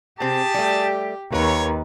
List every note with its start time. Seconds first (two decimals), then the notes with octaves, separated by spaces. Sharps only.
0.20 C3 C4 G4 G#4 A5
0.54 G3 A3
1.32 D#2 A#4 B4 C#5